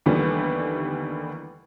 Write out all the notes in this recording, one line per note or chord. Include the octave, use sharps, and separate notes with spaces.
D#2 D3 E3 G3 A3 B3